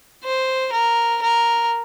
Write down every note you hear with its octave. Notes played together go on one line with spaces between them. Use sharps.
C5
A#4
A#4